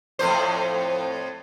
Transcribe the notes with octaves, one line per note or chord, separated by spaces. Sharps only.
F2 A2 C5